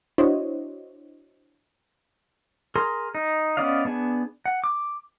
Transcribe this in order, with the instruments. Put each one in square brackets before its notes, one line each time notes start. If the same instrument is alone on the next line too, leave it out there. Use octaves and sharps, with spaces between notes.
[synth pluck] D4 E4 F#4 C5 C#5 D#5
[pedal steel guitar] G#4 A#4 C6
D#4
B3 C#4 D5 D#5 F5
B3 D4 G#4
F#5
D6